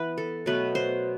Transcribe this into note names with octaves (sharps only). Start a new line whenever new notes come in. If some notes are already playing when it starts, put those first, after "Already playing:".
Already playing: E3 B3 B4
A4
B2 F#3 A3 B4
C5